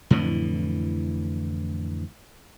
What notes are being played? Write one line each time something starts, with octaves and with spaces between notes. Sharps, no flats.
F2 A2 D3 E3